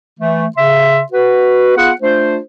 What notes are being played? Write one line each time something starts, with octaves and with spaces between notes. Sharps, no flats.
E3 A3
C#3 E5 C6
F#4 B4
B3 F4 G#4 F#5
A3 D4 F4 C5